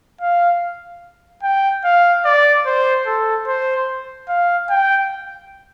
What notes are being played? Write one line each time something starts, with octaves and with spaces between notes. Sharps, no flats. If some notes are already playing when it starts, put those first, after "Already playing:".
F5
G5
F5
D5
C5
A4
C5
F5
G5